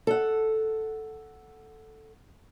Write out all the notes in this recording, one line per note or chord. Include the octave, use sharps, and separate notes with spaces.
A4 F#5